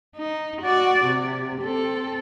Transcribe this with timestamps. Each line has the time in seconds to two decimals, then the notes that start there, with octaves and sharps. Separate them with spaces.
0.17 D#4
0.62 F#4 D5
1.05 C3
1.62 C4 A4